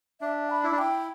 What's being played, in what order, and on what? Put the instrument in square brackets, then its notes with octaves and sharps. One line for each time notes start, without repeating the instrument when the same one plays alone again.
[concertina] D4 [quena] E5
[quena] B5
[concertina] E4
D4
[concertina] E4 [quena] G5